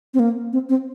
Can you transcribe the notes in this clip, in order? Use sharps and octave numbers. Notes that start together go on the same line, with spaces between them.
C4
A#3
C4
C4